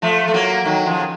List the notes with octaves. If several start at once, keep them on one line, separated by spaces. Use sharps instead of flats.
F3 A3
A3
F#3 A#3
D#3 F#3
C#3 F3